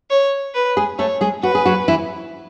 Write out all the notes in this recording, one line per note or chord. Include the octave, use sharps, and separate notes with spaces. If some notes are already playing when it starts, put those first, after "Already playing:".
C#5
B4
G#3 G#4
A3 A4 C#5
G#3 G#4
F#4 B4
G#4
F#3 F#4
E3 E4